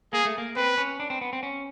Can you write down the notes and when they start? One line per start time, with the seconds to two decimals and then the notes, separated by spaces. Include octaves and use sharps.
0.13 A#3 G#4
0.25 A3
0.38 A#3
0.56 C4 B4
0.78 C#4
1.00 D4
1.10 C4
1.21 B3
1.33 C4
1.43 C#4